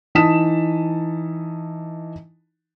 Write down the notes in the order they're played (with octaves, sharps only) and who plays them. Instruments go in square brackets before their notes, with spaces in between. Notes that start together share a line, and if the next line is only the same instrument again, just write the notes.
[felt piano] E3 D#4 A5 D#6 B6 E7